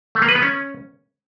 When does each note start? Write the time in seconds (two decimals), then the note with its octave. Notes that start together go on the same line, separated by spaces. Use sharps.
0.15 A3
0.22 A#3
0.29 B4
0.35 B3
0.42 C#4